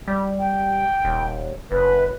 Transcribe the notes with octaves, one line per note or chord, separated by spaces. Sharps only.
G3
G5
D#1
F#1 B4